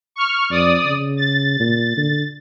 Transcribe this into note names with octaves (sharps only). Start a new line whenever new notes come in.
C#6 F6
F2 D5 D#6
C#3
A6
A#2
D3